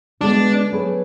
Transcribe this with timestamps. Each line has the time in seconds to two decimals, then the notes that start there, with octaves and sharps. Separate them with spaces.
0.21 D3 G#3 B3 D4 F#4
0.72 F#3 A3 D4 G#4 B4